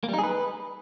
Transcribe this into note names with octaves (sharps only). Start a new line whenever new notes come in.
A#3
G3
D#4
G#4
B4